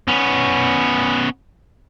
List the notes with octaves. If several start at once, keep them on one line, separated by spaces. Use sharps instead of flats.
B3 C#4